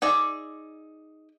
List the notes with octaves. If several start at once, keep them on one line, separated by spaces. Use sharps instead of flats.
D#4 G#4 D5 E5